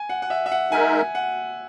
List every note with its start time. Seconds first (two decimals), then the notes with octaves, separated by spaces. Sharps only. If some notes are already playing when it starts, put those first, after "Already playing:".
Already playing: G#5
0.09 F#5
0.22 F#5
0.30 E5
0.46 E5
0.52 F#5
0.72 G#3 D#4 A#4 E5 G#5
1.15 F#5